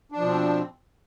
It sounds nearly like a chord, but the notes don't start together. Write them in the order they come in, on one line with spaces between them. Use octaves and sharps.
D4 F3 B2 C4